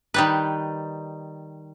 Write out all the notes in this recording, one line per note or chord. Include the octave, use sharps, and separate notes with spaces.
D#3 G3 B4